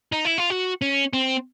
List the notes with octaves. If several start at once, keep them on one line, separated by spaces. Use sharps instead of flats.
D#4
E4
F4
F#4
C#4
C4